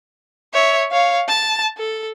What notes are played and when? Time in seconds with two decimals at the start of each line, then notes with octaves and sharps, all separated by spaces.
0.54 C#5 E5
0.91 C#5 F5
1.29 A5
1.78 A4